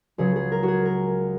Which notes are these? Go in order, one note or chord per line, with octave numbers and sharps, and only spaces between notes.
C#2 C#3 F#3 G#4
G#4
A#4
F#4
G#4
A#4